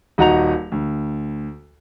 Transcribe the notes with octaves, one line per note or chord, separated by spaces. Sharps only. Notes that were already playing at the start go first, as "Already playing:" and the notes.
D#1 D#4 F#4 F#5 A#5 F7
D2